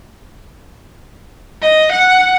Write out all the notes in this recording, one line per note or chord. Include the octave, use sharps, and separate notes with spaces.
D#5
F#5